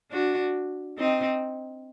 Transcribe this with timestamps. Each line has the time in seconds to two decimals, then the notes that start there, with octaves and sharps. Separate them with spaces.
0.12 D4 F#4
0.98 C4 D#4